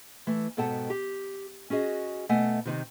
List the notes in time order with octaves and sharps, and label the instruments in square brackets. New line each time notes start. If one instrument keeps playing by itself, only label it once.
[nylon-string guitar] E3 A3
G#2 B2 A4 F#5 G5 A5
G4
C#4 F#4 G#4 D#5
B2 A3 D#5 F#5 G#5
C3 D#3 C4